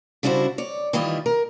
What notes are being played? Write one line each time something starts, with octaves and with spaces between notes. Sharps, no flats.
C#3 G3 D4 E4 F#4 C5
C#5 D5
D#3 E3 G3 E4 F4 D#5
A#4